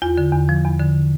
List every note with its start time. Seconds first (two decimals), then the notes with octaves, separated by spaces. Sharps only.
0.02 E2 F4
0.18 D3
0.33 E2
0.49 F3
0.64 E2
0.79 D3